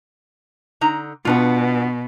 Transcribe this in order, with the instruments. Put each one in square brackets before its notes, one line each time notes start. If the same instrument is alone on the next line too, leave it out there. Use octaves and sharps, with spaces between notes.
[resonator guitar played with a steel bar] D3 D#4 A#5
[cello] B2 [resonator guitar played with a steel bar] B3 D4 F4